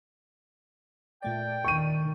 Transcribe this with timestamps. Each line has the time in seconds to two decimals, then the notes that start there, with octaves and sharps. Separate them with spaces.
1.22 A#2 A3 D5 G5
1.65 D#3 C#6 D#7